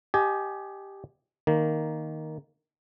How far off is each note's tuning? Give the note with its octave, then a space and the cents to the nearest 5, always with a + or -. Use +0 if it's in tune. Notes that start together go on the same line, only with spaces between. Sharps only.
G4 +0 D#5 -5 G#5 +25
D#3 +0 A#3 +0